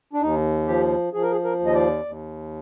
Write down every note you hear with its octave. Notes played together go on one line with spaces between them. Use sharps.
D4
D#2 D#4
F3 G4
F3 G#4
A#4
G#4
A#4
D#2
D#5
D5
D#2